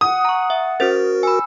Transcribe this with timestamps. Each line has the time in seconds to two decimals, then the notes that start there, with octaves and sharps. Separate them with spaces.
0.01 F#5 D#6
0.25 A#5 C#6
0.50 E5
0.80 C#4 F#4 A#4 C5 A6
1.23 G#5 B5 E6